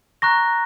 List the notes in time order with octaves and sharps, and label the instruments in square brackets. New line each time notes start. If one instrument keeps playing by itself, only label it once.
[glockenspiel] A#5 C#6 F#6 A#6